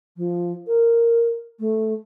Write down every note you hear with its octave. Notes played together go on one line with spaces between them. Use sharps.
F3
A#4
A3